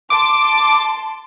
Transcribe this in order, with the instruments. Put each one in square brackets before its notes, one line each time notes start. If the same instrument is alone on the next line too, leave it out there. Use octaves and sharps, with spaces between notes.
[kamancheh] A5 C6 [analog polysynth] D6